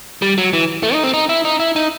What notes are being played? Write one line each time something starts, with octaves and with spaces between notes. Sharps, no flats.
G3
F#3
E3
A3
D#4
C4
D#4
E4
D#4
E4
D#4